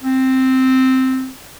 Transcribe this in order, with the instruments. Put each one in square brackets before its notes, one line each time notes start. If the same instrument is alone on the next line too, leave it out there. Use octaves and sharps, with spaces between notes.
[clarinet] C4